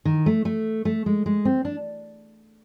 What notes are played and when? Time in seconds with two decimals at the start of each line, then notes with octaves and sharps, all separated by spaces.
0.05 D#3
0.26 A3
0.45 A3
0.85 A3
1.06 G#3
1.26 G#3
1.45 C4
1.65 D4